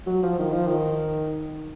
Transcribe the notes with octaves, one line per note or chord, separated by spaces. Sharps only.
F#3
F3
D#3
F3
D#3